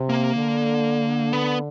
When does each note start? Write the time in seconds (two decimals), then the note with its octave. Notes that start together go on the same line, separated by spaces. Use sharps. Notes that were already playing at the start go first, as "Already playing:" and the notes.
Already playing: C3
0.09 A#3
0.34 D3
1.33 B3